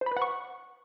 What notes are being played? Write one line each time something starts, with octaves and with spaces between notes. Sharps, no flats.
C5
B5
B4
F#5
C#6